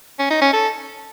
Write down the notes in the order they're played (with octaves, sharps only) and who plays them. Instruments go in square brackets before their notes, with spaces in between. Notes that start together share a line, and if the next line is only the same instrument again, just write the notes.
[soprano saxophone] C#4
D#4
C#4
A4